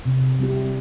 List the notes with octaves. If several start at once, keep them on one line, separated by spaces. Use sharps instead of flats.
C3
G3 C4 E4 G4